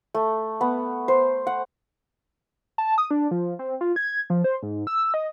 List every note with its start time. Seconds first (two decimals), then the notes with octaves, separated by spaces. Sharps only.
0.14 A3
0.61 B3
1.08 C5
1.47 F#5
2.78 A5
2.98 D#6
3.11 D4
3.31 F3
3.59 C4
3.81 F4
3.96 G#6
4.30 F3
4.44 C5
4.63 G#2
4.87 E6
5.14 D#5